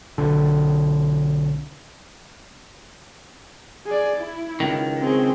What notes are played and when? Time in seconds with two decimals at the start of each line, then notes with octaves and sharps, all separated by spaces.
0.18 B1 D3
3.86 G#4 D5
4.17 E4
4.60 C#2 D#3
5.00 C4 G#4